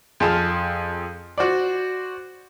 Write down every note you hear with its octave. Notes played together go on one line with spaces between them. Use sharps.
F2 G#4 A5 C6 F6
F#4 C5 D5